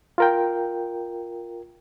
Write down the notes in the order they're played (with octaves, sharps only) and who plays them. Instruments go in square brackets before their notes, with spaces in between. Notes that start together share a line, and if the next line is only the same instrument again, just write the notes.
[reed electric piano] F4 A#4 G5